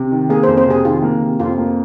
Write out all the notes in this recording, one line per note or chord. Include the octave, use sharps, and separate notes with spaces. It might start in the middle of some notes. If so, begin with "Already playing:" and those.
Already playing: C3
D#3
A#3 G#4
F2 C5
C5
C3 G#4
D#3 F4
A#3
C3
F2 F4
A#3